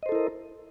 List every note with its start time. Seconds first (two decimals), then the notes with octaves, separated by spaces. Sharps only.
0.03 D#5
0.06 C5
0.09 A4
0.12 E4
0.15 A#4